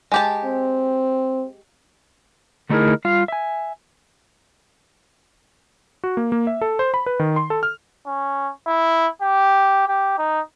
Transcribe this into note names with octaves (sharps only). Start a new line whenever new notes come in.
G#3 G4 A5
C4
D3 A3 D#4 E4 G#4 A#4
G3 F4 F5
E5 G#5
F#4
A#3
A#3
E5
A4
C5
B5
B4
D#3
C6
A4
F6
C#4
E4
G4
G4
D#4